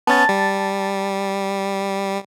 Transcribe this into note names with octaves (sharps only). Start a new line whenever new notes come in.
B3 C#4 A5 A6
G3